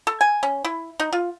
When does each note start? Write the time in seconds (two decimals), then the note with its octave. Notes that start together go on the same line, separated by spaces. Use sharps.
0.07 A4
0.21 G#5
0.43 C#4
0.64 E4
1.00 D#4
1.13 F4